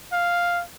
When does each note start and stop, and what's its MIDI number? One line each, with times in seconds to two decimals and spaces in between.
0.12 0.64 77